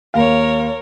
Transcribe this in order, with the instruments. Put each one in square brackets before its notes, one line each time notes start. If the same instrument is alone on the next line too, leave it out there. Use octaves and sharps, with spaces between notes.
[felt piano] D#2 F5 [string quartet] A#4 C#5